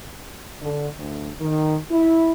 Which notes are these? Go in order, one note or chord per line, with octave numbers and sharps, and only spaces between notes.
D3
D2
D#3
E4